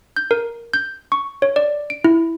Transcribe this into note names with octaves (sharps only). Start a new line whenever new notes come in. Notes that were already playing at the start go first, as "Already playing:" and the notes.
G6
A#4
G6
C#6
C#5
D5
D7
E4